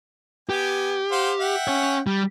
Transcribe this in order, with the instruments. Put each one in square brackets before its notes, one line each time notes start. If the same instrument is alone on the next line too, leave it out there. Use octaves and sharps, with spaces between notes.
[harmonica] B3 G#5 [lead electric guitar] G4
[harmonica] C5 F5 F#5
E5 F#5 G5
[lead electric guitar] C#4 C#5
G3